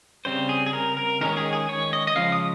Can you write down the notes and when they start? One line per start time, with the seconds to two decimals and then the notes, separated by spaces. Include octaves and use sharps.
0.25 C#3 G3 C4 C5
0.49 G#4
0.66 G#4
0.73 A#4
0.97 A#4
1.21 D#3 G#3 C#4 A#4
1.37 G#4
1.53 G#4
1.69 C#5
1.93 D#5
2.07 D#5
2.16 C#3 F3 G#3 F5
2.32 D#6